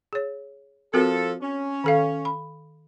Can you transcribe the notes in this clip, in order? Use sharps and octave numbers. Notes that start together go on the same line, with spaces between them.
G#4 C#5
F3 C4 F#4 A4 A#4
C#4
D#3 A4 F5
B5